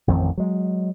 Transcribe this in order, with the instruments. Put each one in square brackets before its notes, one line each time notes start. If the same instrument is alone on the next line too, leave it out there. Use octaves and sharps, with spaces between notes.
[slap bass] A1 F2 D#3 C4
F#3 G#3